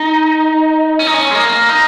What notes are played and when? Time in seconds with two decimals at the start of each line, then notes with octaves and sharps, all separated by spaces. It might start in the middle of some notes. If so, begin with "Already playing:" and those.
Already playing: D#4
0.99 C#4
1.07 D#4
1.14 C#4
1.31 G#3
1.35 A#3
1.69 D#4